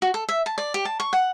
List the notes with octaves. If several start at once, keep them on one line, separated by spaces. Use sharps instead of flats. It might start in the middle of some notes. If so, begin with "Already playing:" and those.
F#4
A4
E5
A5
D5
G4
A5
C#6
F#5